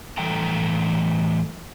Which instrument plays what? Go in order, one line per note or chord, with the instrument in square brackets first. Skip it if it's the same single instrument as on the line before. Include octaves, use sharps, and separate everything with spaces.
[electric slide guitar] A2 E3 G3 A4 G5 A#5